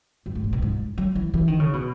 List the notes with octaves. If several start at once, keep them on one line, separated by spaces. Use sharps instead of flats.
F#2
G#2
A2
B2
G#2
F#3
E3
E3
D#3
C#3
B2